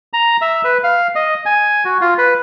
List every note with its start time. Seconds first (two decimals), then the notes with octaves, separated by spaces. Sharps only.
0.13 A#5
0.41 E5
0.64 B4
0.84 F5
1.16 D#5
1.46 G#5
1.85 F#4
2.01 F4
2.18 B4